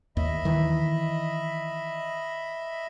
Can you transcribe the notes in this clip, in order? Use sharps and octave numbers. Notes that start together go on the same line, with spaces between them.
D#2 D#5 E5 B5
D#3 E3